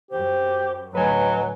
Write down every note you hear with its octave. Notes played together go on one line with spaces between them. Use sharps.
F#2 G4 C5
D2 A2 F#3 B4 D#5 G#5